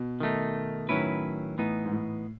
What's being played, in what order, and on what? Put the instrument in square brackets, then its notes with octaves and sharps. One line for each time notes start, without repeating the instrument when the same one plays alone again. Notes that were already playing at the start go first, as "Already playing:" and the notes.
Already playing: [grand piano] B2
[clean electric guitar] D#3 A3 D#4
[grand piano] A2 [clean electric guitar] D#3 F#3 C#4 E4 B4
[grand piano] A2 [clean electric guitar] E3 B3 D#4
[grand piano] G#2
A2